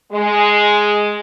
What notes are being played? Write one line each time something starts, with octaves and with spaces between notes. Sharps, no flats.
G#3